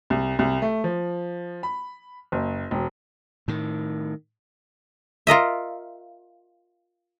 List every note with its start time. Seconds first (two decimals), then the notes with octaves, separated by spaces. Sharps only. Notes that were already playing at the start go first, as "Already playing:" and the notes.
0.10 C2
0.39 C2
0.62 A3
0.84 F3
1.63 B5
2.32 F#1
2.71 E1
3.48 A2 D#3
5.27 F4 A#4 D#5 E5